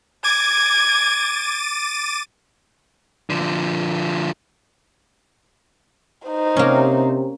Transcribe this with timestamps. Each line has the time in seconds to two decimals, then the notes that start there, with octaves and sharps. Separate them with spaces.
0.24 D6 G#6 A6 D#7
3.30 D3 F3
6.28 D#4 C5
6.56 C3 A#3 C#4